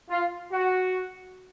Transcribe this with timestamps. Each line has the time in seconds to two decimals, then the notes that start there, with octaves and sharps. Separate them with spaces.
0.10 F4
0.51 F#4